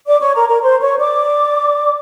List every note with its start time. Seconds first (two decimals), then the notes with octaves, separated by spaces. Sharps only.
0.07 D5 D6
0.21 C#5 C#6
0.35 A#4 A#5
0.49 A#4 A#5
0.62 C5 C6
0.81 C#5 C#6
0.99 D5 D6